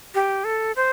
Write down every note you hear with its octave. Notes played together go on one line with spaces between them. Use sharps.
G4
A4
C5